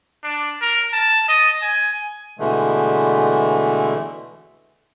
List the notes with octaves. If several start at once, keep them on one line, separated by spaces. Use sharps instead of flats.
D4
A#4
A5
D#5
G#5
B2 D3 E3 G#3 A3